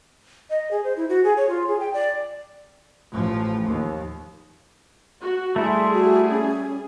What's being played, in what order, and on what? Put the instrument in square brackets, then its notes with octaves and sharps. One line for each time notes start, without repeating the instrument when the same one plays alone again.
[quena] D#5
G#4
C5
E4
F#4
G#4
C#5
F4
G#4
G5
D5
[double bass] A1 F3
D#2
[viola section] F#4
[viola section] G3 G#4 [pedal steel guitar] A3 E4 [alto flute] C6
[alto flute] F#4
C#4